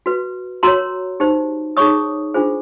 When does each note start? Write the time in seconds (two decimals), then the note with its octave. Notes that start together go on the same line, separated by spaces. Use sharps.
0.06 F#4 B4
0.63 F#4 A#4 C#5 A#5 C6
1.20 D#4 G4 C5
1.77 D#4 G#4 C#5 C#6 D#6
2.34 D4 F4 G#4 C5